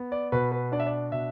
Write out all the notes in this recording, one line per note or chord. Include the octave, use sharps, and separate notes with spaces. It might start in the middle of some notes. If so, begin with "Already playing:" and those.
Already playing: B3
D5
B2 B4
B4
D4 D5
E5
D5
B2 E5